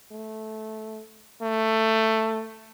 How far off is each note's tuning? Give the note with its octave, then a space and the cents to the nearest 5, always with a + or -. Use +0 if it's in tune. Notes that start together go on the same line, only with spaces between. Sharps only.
A3 -10
A3 +10